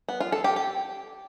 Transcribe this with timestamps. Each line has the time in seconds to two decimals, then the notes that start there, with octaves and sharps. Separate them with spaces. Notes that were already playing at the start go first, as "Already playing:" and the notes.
0.09 B3
0.20 F4
0.32 A4
0.44 G4
0.56 G4